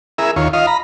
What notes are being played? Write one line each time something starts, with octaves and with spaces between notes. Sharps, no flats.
E4 G#4 A#4 E5
D#2 F4 C#5
F4 D#5 F5
A#5 B5